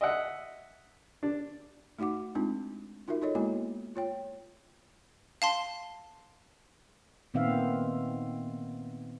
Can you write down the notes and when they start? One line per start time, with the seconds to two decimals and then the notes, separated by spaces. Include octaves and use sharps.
0.01 D#5 E5 F#5
1.23 D4
1.99 A3 D#4 F#4 F#5 D6
2.35 G#3 C4 D4 D#4 F4
3.08 D#4 F4 F#4 A#4 E5
3.22 D#4 F4 A4 C#5 D#5
3.35 G#3 A#3 B3 E4 F#4 G#5
3.95 F4 C#5 G5
5.42 F5 A5 C6
7.34 A#2 D#3 B3 C4 E5 F5